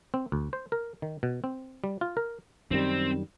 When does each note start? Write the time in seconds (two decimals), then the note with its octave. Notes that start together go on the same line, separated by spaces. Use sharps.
0.14 C4
0.32 D2
0.53 C5
0.72 A#4
1.02 D#3
1.23 B2
1.44 C4
1.84 G3
2.01 F4
2.17 A#4
2.71 F#2 D#3 G3 C4